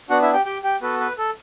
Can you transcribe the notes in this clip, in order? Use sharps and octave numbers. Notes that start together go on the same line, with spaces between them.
B3 D4 F#4 F#5
E4 E5
G4 G5
G4 G5
G4 G5
B3 F#4 A4 B4
B4
A4